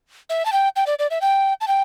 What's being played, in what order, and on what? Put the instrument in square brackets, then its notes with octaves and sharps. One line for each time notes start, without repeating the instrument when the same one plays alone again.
[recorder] E5
A5
G5
G5
D5
D5
E5
G5
A5
G5